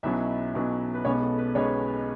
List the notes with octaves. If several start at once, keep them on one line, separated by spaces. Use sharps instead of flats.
B1 B2 F#3 C#4 E4 E5
B1 B2 F#3 C#4
B4
B1 B2 G#3 B3 C#4 C#5
A4
B4
B1 B2 G#3 B3 C#4 C#5